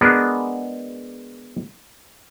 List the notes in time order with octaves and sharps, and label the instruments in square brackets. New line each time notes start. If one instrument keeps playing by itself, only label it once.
[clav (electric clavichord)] G#3 B3 D4 F#4 G#4 A#4